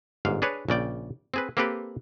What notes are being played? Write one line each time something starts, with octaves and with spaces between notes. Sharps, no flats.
G1 G#2 F5
D4 G#4 B4 C#5
A#1 C#3 D5 G5
C4 G#4 B4
A#3 C4 G4 A4 B4 G5